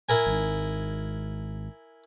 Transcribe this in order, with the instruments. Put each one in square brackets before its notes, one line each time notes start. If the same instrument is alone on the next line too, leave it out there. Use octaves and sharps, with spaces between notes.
[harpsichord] E4 A#4 G#5
[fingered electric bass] G#1 G#2